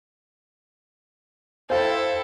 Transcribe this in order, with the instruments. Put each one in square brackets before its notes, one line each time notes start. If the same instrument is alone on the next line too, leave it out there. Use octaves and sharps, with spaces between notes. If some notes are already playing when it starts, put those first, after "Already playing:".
[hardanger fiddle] E4 A4 [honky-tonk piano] C5 F5 G5